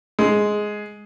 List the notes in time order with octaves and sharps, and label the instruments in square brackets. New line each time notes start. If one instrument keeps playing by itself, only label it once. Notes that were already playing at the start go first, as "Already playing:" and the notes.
[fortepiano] G#3